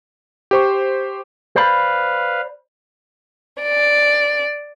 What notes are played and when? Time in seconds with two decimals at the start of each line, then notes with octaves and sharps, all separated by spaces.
0.51 G4 C5 C#6
1.56 B4 C5 D5 F5 B5
3.61 D5